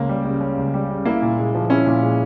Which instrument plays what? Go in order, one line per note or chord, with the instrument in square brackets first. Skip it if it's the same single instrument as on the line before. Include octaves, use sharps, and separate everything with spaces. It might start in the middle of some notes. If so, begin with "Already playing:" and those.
Already playing: [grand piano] C#2 C#4 [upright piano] A#3
[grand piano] G3
C#3
C#4
C#2
G3
C#3
[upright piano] A#3 [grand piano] E4
[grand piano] A#2
G#3
F3
[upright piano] C#4 [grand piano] E4
[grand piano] A#2
G#3